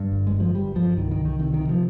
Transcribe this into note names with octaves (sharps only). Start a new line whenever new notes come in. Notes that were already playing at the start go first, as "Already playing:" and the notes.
Already playing: G2
G1
G#3
G1
F3
G2 G3
G2 F3
C2 D#3
D#3
C2
D#3
C3 D#3
D#3
C3
F3